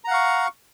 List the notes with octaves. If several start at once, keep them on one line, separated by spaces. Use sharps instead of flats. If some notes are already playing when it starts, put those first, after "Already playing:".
F5 F#5 A#5 C#6